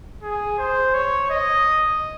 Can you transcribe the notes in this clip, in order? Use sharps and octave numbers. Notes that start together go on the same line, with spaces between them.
G#4
C5
C#5
D#5